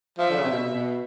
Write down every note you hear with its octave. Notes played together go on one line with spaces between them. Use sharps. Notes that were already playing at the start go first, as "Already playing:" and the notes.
F3 E5
D3
C#3
C3
B2
B2